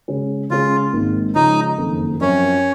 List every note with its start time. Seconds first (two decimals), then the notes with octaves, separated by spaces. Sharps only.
0.08 C#3 G#3 C#4
0.50 C#3 G#3 C#4 F4 G#4
0.93 G#1 G#2 D#3 A#3
1.35 C#3 F3 G#3 D#4
1.78 F#1 F2 D#3 A#3
2.21 F#2 F3 C4 C#4 F4 A#4